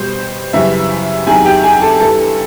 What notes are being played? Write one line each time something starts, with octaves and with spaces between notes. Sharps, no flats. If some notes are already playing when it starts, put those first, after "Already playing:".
Already playing: B2 G3 C5
F#2 C#3 E3 G3 E4 E5
E2 C3 D#3 F#3 G#4 G#5
G4 G5
G#4 G#5
A4 A5
G2 E3 G3 A4 A5